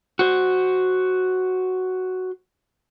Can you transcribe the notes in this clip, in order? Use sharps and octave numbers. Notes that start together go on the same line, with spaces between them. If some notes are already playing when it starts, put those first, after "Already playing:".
F#4 C5